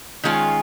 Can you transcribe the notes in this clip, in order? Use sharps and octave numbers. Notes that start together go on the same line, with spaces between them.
D#3 G#3 C#4 F4